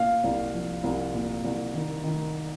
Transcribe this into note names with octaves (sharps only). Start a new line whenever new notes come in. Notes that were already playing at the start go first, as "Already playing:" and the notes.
Already playing: A#2 F5
C2
F3
C2
A#2
C2
D#3
D#3